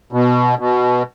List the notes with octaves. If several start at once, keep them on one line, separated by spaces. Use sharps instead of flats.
B2
B2